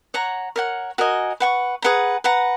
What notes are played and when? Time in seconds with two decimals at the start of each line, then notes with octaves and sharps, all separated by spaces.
0.14 C#5 F#5 A#5
0.56 A#4 C#5 F#5
0.98 F#4 A#4 D#5 G#5
1.40 B4 F#5 C#6
1.82 G#4 B4 F#5 A#5
2.24 B4 F#5 A#5